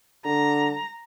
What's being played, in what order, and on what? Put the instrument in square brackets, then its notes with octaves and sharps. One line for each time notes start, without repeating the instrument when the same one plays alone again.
[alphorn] D3 [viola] A#5